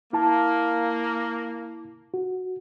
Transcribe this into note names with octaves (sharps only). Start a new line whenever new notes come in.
A#3 E4 A5
F#4